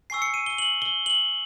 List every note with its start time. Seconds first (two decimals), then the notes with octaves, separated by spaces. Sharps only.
0.10 G#5 C#6 E6 C7
0.22 C#7
0.34 D#7
0.46 G7
0.58 F#7
0.82 G7
1.06 F#7